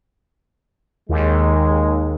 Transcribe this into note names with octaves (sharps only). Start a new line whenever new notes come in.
D#2 D#3 G#3